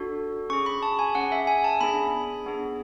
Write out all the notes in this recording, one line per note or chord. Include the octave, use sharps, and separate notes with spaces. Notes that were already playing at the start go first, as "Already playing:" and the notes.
Already playing: D4 F#4 A4
C#4 G#4 C#6
B5
A5
G#5
C#4 G#4 F#5
E5
G#5
A5
B3 D4 G#4 B5
B3 D4 G#4